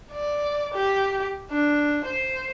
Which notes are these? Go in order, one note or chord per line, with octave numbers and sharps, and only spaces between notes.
D5
G4
D4
C5